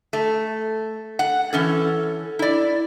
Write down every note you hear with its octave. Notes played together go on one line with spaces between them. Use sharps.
A3
F#5
E3 C#4 A4
E4 D5